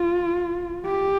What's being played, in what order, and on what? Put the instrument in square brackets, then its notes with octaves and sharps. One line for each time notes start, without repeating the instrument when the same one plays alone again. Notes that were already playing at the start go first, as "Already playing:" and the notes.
Already playing: [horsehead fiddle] F4
G4